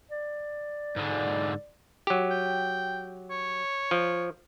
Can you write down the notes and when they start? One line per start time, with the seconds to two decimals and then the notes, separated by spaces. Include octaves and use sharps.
0.11 D5
0.96 G#2 D3
2.07 F#3 G4
2.31 G5
3.31 C#5
3.91 F3